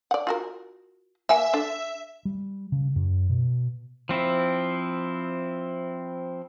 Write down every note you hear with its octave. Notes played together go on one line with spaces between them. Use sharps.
D5 F#5
F4 F#4 A#4
A#3 A#4 E5 G#5
D4 A4
G3
C#3
F#2
B2
F3 C4 E4